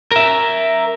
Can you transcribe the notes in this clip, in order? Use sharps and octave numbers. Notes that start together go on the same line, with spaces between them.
A#4 E5